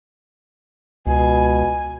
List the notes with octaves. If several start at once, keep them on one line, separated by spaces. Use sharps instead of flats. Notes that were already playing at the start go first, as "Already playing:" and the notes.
C#2 B2 G#5